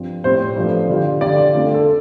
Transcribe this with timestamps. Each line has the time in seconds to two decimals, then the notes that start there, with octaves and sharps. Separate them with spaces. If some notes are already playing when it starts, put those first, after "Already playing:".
Already playing: G2 F3 C4
0.24 A2 G3 C4 C5
0.56 G2 F3 A3
0.89 D3 G3 F4
1.21 D3 G3 F4 D5
1.54 D3 A3 C4 F4
1.74 A4